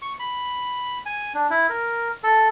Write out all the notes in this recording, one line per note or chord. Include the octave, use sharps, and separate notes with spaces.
C#6
B5
G#5
D4
E4
A#4
A4